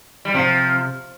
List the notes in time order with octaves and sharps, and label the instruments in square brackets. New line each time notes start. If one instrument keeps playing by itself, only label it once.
[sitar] G3
[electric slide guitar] C3 [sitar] F3